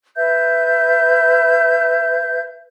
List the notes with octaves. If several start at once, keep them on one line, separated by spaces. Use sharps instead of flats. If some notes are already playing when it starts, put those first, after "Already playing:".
B4 E5 G6